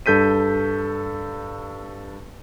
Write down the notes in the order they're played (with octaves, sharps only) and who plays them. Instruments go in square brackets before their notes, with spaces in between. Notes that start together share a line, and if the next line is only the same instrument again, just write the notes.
[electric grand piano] G2 A4 G6 B6 D#7